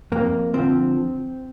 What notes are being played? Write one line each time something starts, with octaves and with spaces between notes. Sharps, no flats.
F2 A#3
D3 F3 C4